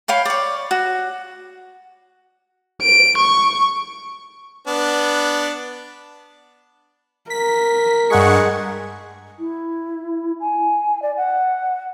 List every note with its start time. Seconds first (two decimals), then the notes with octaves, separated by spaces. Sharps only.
0.08 C#5 F5 G5 B5
0.25 C#5 D5
0.71 F#4
2.83 D7
3.18 C#6
4.67 B3 D4
7.30 A#4 B6
8.10 G2 G#3 G#4 F#5 C#6
9.39 E4
10.40 G#5
11.02 D5
11.17 F#5